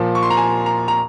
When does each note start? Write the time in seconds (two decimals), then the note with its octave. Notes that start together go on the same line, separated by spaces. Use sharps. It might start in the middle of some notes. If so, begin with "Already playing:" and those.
Already playing: A#2 F3
0.15 C#6
0.23 C6
0.30 A#5
0.37 G#5
0.66 A#5
0.88 A#5